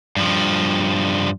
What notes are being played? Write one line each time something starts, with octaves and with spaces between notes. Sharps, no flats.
G2 F3